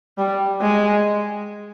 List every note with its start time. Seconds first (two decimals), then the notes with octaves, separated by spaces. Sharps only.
0.18 G3
0.61 G#3